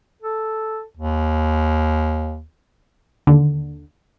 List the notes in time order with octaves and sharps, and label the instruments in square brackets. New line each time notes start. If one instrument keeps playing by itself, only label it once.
[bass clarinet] A4
D#2
[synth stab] D#2 D3